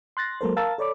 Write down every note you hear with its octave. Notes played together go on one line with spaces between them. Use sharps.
C6 F#6 A6 A#6
F#3 G#3 A#3 A4 A#4 C5
A#4 F5 A5 A#5 E6 A6
A4 C#5 D5 B5 D6